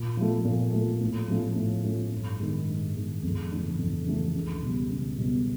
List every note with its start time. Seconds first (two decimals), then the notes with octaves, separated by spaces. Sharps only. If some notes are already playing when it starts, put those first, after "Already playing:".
Already playing: A#2
0.17 F3 A3
0.45 A#2
0.73 F3 A3
1.01 A2
1.28 F3 A3 C#4
1.56 A2
1.84 F3 A3 C#4
2.12 G2
2.39 D#3 G#3
2.67 G2
2.95 D#3 G#3
3.23 F2
3.51 C#3 E3 A3 D4
3.78 F2
4.06 C#3 E3 A3 D4
4.35 C#2
4.62 B2 G3
4.91 C#2
5.18 B2 G3